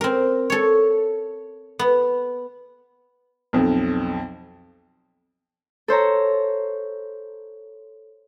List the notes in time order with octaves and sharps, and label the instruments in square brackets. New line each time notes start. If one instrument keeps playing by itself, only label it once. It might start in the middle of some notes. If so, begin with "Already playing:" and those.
[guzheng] C4 A#4
A4 C#5
B3
[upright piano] B1 F2
[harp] A4 C5 C#5 A#5